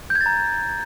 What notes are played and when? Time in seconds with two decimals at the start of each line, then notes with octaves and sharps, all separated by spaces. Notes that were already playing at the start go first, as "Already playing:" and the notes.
0.10 G6
0.15 G#6
0.21 A6
0.26 A#5